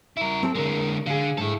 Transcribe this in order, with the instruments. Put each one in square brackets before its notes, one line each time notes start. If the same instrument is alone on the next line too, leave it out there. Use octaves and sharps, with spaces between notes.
[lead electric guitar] E4 A#4
[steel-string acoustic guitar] C4 A4
[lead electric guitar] D3 G#3 [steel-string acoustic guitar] A#4
[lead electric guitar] D3 [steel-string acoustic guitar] G#4 F5
[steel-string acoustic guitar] G#2 [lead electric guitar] E4 A4